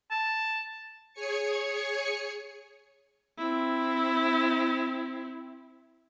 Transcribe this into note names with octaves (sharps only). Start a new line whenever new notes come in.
A5
G#4 C#5 G#5 C#7
C4 E4